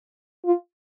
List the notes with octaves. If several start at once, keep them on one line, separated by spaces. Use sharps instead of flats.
F4